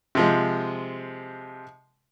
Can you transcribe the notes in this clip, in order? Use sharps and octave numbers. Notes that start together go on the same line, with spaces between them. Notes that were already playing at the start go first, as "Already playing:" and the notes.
C3 F3 G#3